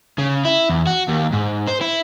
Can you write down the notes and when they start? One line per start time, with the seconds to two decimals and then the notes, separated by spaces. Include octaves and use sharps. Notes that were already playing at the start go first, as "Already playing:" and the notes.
0.19 C#3
0.45 E4
0.70 E2
0.87 F#4
1.09 D#2
1.33 G#2
1.68 C5
1.81 E4